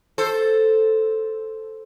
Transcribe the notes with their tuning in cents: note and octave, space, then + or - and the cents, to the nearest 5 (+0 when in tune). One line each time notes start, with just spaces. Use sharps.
A4 +0 C5 +0